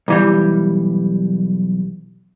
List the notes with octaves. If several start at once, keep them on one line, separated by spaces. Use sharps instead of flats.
B1 E3 G3